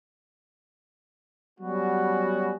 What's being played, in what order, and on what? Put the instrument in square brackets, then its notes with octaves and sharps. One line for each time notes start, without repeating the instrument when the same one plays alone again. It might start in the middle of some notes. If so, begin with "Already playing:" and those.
[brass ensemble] F#3 G3 B3 C#4 F#4